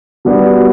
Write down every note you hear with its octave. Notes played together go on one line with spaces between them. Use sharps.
B2 G3 B3 D4